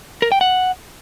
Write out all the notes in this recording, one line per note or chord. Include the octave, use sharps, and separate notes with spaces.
A#4
G5
F#5